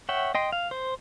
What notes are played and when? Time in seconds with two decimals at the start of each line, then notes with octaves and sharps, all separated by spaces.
0.09 C#5 E5 F#5 G5
0.35 D#5 G5 C6
0.52 F5
0.71 C5